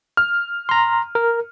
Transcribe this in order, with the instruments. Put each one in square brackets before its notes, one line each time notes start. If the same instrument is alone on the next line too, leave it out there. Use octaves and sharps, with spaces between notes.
[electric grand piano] F6
[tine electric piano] A#5 C6
A#4